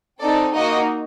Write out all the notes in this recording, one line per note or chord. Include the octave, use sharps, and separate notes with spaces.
C4 D#4 A4 D5
A#3 D#4 F#4 D#5